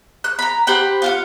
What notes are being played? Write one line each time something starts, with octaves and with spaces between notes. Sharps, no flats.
F#6
A#5 B5
G4 C5 F#5 B5
F4 F5 F#5